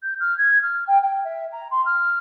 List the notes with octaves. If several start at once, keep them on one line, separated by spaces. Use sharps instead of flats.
G6
F6
G#6
F6
G5
G5
E5
A#5
C6
F6